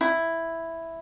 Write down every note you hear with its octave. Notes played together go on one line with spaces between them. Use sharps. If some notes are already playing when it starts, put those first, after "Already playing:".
E4